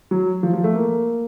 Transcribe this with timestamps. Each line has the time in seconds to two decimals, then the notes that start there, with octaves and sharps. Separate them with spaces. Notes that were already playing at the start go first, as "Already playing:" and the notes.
0.11 F#3
0.43 F3
0.53 F3
0.64 A3
0.74 A#3